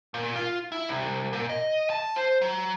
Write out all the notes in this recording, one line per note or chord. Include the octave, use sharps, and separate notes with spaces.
A#2
F4
E4
C2
A#2
D#5
A5
C5
F#3